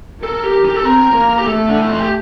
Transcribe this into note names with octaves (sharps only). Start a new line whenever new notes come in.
A4 A#4
G4
G4
A4
C4 A#4
A#3
G4
A3 A4
D4
E4
F4
G4